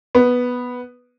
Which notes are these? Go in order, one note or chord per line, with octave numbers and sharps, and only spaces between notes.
B3